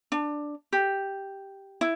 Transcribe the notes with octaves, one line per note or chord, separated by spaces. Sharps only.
D4
G4
E4